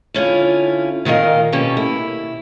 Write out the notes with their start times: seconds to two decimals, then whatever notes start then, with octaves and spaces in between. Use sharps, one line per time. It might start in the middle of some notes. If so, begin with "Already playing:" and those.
0.14 D3 C#4 E4 F4
1.05 A#2 D#3 A#4 D5 D#5 F5
1.52 B2 A#3 C#4 G4 A4
1.77 E4